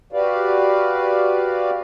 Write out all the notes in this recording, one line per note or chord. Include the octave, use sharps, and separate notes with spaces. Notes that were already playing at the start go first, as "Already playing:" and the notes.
F#4 G4 B4 D5 F5